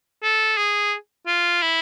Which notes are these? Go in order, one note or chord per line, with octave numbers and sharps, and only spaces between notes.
A4
G#4
F4
E4